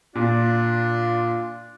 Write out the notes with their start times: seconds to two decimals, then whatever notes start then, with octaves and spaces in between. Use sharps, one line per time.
0.16 A#2 D4 F4